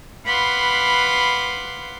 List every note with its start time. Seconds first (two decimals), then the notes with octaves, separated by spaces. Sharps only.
0.24 B4 F5 F#5 B5 C6 D6